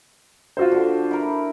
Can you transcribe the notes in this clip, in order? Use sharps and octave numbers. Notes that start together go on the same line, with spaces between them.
F4 F#4 C5
D3 D4
E4 A#4 B5